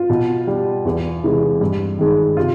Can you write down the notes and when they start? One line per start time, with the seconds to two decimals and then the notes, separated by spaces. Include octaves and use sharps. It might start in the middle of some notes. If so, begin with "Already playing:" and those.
Already playing: F4
0.10 B2
0.47 G3
0.85 E2
1.23 C3 E3 G#3
1.61 G2
1.99 D#3 G#3
2.37 C3 F4